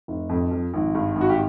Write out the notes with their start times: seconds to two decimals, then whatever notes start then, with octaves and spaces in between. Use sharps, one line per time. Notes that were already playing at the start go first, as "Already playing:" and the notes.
0.08 F1
0.29 F2
0.51 F3
0.74 G#1
0.95 G2
1.16 G#1
1.21 F#4
1.29 G4